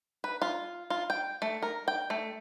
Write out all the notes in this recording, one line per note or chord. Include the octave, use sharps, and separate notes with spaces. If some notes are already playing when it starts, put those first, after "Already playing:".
B4
F4
F4
G5
A3
A#4
G5
A3